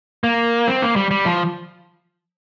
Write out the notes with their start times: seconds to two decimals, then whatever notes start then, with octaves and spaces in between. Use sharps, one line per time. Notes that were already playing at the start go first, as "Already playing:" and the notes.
0.24 A#3
0.67 C4
0.82 A#3
0.96 G3
1.11 G3
1.26 F3